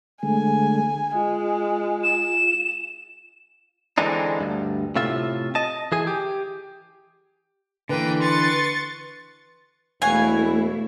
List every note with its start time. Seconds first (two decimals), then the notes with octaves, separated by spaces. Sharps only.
0.23 D3 G#3 A3 G#5
1.15 G#3 F4
2.03 E7
3.98 D3 E3 G#3 C4 D4 D#4
4.40 D2 G2
4.96 A2 C3 F4 E5
5.55 D#5 A5
5.92 E3 G#4 G#5
6.07 G4
7.89 D3 E3 A#3 B4 G5
8.22 C6 C#6 A6
10.02 E1 A3 A#3 E4 C#5 F5 F#5 G#5